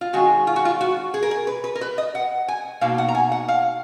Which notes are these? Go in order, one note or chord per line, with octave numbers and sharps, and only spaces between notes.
F4
D#3 G#3 C#4 F#4
F4
F#4
F4
F#4
G#4
A#4
G#4
B4
B4
A#4
B4
D#5
F#5
G#5
B2 A#3 D#4 F5
F#5
A#5
G#5
F#5
F5